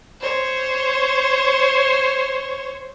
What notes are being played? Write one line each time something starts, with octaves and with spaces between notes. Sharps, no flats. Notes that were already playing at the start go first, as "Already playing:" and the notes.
C5 C#5